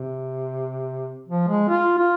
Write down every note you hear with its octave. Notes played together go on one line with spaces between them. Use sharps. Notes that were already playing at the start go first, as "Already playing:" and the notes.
Already playing: C3
F3
G#3
F4
F4